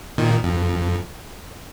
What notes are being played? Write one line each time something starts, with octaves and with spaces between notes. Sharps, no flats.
A#2 D#3
F2